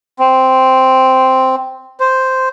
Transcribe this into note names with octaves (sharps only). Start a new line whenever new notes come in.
C4
C5